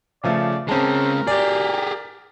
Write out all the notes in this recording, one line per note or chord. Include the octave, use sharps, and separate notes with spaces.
C#3 F3 A3 D5
G#3 C4 C#4 A#4 A5
G4 G#4 D5